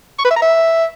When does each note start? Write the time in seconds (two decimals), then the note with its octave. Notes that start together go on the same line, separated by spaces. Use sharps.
0.19 C#6
0.25 B4
0.31 E5
0.36 A#5
0.42 E5